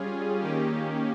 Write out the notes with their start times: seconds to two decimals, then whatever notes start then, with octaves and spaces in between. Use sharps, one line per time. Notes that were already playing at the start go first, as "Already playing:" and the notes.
Already playing: G3 C#4 F4 G#4
0.39 D#3 A#3 C#4 G4